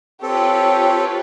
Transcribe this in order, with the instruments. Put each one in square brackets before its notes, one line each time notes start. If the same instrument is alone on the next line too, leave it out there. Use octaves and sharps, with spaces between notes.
[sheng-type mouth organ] C4 A4 [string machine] F4 B4 [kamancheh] G4 C#5